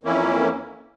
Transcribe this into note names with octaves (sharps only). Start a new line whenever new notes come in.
F2 E3 A#3 C#4 E4